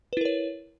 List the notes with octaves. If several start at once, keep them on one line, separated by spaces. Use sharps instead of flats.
E4 A#4 B4 C#5